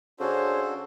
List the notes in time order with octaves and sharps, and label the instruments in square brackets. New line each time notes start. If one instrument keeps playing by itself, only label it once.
[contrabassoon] C#3 [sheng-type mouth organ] D4 F#4 A4 [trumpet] C5 [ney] C#5